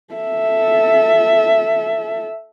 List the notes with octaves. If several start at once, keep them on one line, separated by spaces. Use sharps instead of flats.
A4 E5